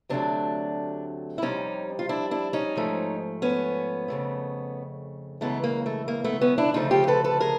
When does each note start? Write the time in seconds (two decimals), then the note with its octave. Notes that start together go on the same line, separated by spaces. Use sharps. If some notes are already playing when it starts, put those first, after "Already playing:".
0.09 D2 C3 D#3 F#3 A3 C4 D4
1.38 E4
1.42 F2 C3 D#3 G3 C#4 D#4
1.99 F4
2.09 D4 E4
2.31 D4 E4
2.53 C#4 D#4
2.76 G#2 F3 A3
3.42 B3 C#4
4.08 F2 C#3 F3 A3
5.41 F#2 C#3 E3 G#3 A3 B3
5.64 A#3
5.86 A3
6.08 A#3
6.24 A3 B3
6.41 B3 C#4
6.58 D4 E4
6.74 D2 C#3 F3 A3 D#4 F4
6.91 F4 G4
7.08 A4 B4
7.24 A4 B4
7.40 G#4 A#4